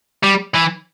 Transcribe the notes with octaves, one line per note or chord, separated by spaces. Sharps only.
G3
E3